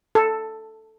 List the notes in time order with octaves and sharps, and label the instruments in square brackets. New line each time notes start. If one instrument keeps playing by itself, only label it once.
[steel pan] A4